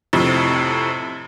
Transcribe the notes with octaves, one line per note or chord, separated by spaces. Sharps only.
F2 A2 C3